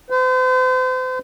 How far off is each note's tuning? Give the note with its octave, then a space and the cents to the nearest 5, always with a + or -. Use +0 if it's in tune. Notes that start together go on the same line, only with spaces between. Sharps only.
C5 -40